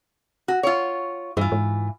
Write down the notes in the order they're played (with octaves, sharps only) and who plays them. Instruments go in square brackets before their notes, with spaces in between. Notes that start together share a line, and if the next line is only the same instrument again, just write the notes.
[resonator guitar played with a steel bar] F#4
F4 C#5
[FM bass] G2 [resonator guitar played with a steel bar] E3 F4
[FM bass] G#2